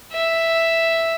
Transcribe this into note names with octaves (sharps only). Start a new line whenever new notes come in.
E5